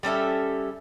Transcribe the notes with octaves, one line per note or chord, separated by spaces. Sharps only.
G3 C#4 A4 E5